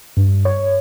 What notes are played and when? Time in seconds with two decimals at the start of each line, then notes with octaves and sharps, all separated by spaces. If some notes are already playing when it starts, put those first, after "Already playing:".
0.17 G2
0.45 C#5